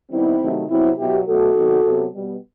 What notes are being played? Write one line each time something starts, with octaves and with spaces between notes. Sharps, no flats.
D#3 G3 B3 C4 E4
C3 D#3 F#3 A3
C3 F#3 B3 C4 E4
B2 F#3 B3 E4 G4
B2 F#3 A3 F#4 A4
C3 D#3 F#3 B3
C3 F#3 B3
B2 G3 B3